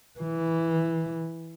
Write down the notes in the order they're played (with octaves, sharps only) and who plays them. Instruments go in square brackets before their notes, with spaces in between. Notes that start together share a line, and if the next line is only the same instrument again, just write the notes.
[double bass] E3